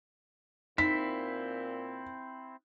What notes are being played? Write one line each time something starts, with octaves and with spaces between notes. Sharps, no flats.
A#2 C4 D#4 E4 B6